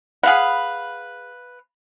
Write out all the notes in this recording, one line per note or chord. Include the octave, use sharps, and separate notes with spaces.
G#4 B4 F5 F#5 B5